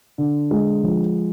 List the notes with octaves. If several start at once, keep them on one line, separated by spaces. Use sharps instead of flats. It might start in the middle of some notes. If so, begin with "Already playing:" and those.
D3
G#3
F3